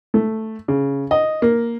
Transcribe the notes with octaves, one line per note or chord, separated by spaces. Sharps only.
A3
C#3
D#5
A#3